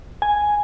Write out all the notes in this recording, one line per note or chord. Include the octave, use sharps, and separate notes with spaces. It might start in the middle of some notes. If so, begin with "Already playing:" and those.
G#5